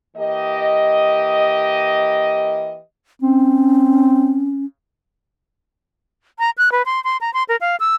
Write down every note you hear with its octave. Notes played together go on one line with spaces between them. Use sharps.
E3 A#3 G4 D#5
C4 C#4
A#5
F#6
B4
C6
C6
A#5
C6
A#4
F5
E6